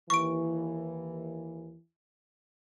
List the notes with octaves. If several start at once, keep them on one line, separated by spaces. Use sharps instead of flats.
D#2 E3 C#6 D7